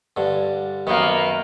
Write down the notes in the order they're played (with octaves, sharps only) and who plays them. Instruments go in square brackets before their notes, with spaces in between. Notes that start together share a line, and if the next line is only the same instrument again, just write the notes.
[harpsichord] G2 D3
[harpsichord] F#2 D#3 [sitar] A#3 B3